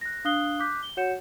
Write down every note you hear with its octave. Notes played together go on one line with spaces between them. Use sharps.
F#6 A#6
D4 F5 D#6 F#6 C7 G7
D6 F#6 G6 B6
G7
F#4 C#5 F#5 G6 C#7 E7